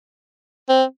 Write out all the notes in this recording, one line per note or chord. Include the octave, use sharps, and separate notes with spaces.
C4